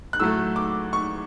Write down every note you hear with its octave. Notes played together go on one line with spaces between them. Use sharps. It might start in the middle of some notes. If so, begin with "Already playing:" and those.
F#6
A2 F#3 A3 E6
D6
C#6